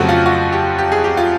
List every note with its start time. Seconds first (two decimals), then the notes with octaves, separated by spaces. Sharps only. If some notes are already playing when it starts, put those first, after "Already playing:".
Already playing: F2 C#3 F#3 A3 C4 F#4 G4
0.09 F4
0.26 F#4
0.52 G4
0.78 G4
0.92 G#4
1.04 G4
1.17 F4